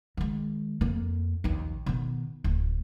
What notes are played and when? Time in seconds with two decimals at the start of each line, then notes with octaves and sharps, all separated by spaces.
0.17 D#3 G#3
0.81 F2 A#3
1.44 A#1 D#2
1.86 B2 D#3
2.44 D1